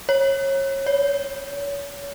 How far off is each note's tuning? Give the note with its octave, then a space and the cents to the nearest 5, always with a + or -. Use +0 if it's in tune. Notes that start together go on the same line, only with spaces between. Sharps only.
C#5 -25
C#5 +35